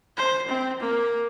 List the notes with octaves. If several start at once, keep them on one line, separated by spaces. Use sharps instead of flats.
C5
C4
A#3